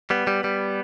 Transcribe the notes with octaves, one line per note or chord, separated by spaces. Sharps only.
G3 B3
G3
G3